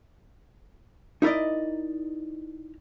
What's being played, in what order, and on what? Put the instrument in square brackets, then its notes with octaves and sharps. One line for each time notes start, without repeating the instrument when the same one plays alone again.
[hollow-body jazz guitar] D#4 E4 A#4 D5 D#5